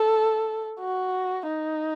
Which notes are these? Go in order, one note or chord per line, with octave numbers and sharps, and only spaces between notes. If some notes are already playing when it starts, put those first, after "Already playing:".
Already playing: A4
F#4
D#4